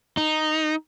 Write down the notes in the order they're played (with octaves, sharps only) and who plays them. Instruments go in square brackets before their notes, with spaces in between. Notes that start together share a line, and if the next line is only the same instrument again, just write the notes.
[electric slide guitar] D#4